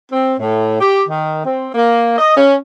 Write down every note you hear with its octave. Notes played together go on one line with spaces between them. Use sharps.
C4
A2
G4
D#3
C4
A#3
D#5
C#4